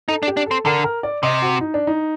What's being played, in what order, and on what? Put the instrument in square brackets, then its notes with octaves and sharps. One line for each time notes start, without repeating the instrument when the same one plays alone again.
[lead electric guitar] D#4 [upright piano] A4
[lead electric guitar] D4
[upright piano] G4
[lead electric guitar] D4
[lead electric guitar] C4 [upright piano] A4
[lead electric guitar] D3 [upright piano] A#4
[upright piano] A#4
D5
[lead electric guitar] C3 [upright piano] D#5
[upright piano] F#4
D#4
D4
D#4